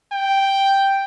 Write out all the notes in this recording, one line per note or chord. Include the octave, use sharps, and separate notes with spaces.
G5